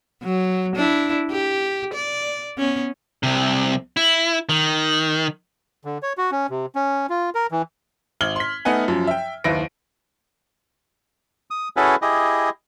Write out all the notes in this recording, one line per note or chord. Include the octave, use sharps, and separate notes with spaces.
F#3
D4 E4
G4
D5
B3 C#4
C2 C3
E4
D#3
D3
C#5
F#4
C#4
C3
C#4
F4
A#4
E3
G#1 F6 G#6 F#7 G7
C6 B6
A3 B3 D#4 F#5 G#5
F#2 F3
E5 G5
F#1 D#2 E4 B4 A#6 D7
D#6
C#4 E4 F#4 G#4 A4 B4
E4 G4 G#4 D#5